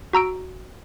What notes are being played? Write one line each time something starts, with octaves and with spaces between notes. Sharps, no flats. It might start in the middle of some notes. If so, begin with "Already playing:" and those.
F#4 A#5 E6 D7